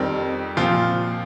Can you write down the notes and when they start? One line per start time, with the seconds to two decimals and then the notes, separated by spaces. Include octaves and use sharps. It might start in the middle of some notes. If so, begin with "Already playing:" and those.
Already playing: F2 D#3 G3 C4
0.57 A#2 F3 C4 F4